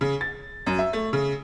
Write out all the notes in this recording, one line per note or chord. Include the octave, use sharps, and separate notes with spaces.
C#3
A6
F#2
E5
A3
C#3